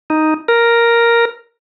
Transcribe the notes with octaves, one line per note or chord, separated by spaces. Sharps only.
D#4
A#4